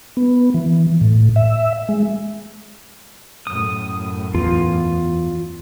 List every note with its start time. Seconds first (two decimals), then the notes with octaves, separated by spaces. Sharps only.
0.17 B3
0.54 E3
1.01 A2
1.36 E5
1.89 G#3
3.47 F#2 A2 D#6
4.35 E2 F4